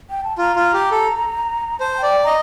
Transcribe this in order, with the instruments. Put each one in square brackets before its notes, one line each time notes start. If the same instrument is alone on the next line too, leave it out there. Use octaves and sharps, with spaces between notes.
[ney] G5
A5
[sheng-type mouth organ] F4 [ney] A#5
[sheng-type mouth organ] F4
G4
A4
[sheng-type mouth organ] C5 [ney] A5
[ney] G5
[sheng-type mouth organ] D5
[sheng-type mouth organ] D#5 [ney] A#5